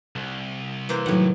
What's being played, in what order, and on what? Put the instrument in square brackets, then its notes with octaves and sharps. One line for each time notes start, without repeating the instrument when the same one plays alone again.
[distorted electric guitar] C2
[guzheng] E3 A#3 C5
[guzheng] A2 F#5 [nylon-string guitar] D#3 F#3 E4